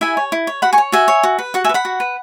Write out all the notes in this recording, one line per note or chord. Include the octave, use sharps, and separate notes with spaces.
E4 E5 G#5
C#5
E4
C#5
F#4 F#5 B5
G#5 C#6
C#5
F#4 E5 G#5
C#5
F#4
B4
F#4 F#5
E5 G#5
B4
F#5 B5
F#4
B4